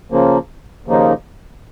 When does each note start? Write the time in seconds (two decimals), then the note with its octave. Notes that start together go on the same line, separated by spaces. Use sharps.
0.12 C#3 F3 A#3
0.86 D#2 C#3 F3 A#3 D#4